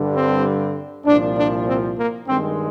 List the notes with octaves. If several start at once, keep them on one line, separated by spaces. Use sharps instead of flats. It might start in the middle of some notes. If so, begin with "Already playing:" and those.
Already playing: G2 D3 G3
C4
C2 A#2 F3 D4
D4
C4
A#3
G2 D#3 G#3 C4